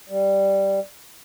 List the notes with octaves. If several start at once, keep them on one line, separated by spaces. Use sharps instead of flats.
G3